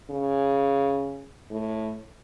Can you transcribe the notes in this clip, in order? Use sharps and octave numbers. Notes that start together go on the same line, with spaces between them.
C#3
A2